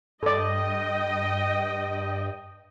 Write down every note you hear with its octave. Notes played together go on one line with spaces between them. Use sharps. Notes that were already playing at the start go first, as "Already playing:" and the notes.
G2 A4 D5 D#5 G5